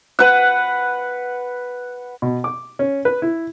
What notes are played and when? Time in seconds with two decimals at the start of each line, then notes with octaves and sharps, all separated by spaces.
0.19 B4 F#5
2.22 B2
2.44 D6
2.79 C#4
3.05 B4
3.22 E4